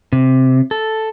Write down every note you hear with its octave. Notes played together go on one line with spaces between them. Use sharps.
C3
A4